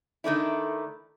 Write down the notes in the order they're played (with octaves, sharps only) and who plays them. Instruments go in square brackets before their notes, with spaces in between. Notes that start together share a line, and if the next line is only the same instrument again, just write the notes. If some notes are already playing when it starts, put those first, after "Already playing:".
[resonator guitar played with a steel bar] D#3 A3 D4 E4